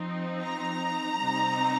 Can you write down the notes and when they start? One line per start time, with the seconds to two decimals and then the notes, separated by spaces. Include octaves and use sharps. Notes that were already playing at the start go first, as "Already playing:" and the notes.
Already playing: F3 C4 D#4
0.41 A#5
1.22 C3 G3 C4 D#4